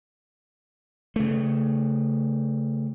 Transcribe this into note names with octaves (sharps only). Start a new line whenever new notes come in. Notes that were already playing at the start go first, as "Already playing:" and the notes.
C#3 A3